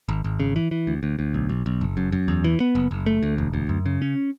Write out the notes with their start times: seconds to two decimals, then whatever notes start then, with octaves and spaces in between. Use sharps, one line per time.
0.09 G#1
0.24 G#1
0.40 C#3
0.56 E3
0.71 E3
0.87 D2
1.03 D2
1.19 D2
1.34 B1
1.49 B1
1.66 B1
1.81 F#1
1.97 F#2
2.12 F#2
2.28 E2
2.44 E3
2.60 B3
2.75 F#1
2.91 F#1
3.06 A3
3.23 D2
3.38 E1
3.54 D2
3.69 F#2
3.86 C#3
4.02 C#4